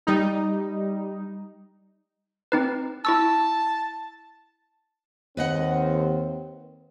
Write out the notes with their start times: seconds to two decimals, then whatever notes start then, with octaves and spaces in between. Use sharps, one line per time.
0.07 G3 D#4
2.52 C4 D#4 B4
3.05 E4 A5 C#6 E6
5.37 D#2 C4 B4 D#5 F#5